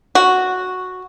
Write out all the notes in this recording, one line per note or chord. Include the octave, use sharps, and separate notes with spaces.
F#4